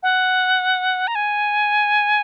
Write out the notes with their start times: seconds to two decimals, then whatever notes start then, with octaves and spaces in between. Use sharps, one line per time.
0.03 F#5
1.07 A#5
1.15 G#5